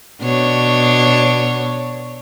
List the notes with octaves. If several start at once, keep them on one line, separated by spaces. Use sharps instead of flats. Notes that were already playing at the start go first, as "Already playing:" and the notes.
B2 D4 C#5